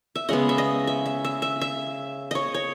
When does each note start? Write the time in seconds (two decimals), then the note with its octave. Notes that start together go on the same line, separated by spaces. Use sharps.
0.16 E5
0.29 C#3 G#3 B3 D#5
0.49 E5
0.58 D#5
0.87 E5
1.06 E5
1.25 E5
1.42 E5
1.61 E5
2.31 C#5 D#5
2.54 C#5